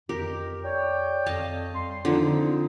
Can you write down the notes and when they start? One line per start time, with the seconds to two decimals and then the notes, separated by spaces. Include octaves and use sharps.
0.09 F2 G4 A#4
0.63 C#5 D5 G5
1.26 F2 D#5 F5 A5
1.74 G3 C6
2.05 D3 F3 C4 D#4